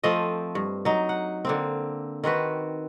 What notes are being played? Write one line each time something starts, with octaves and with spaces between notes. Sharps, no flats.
F3 A3 C4 D#5
G2
F#3 D#4
F#5
D3 A#3 C4
D#3 C4 F#4 B4